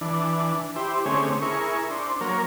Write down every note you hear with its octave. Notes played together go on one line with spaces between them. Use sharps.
E3 D4
E4 G4 C5
D3 A3 C4 C#4 G#4 C#5
E4 G#4 A#4 C#6
D4 C5
F#3 A#3 A#4 C#5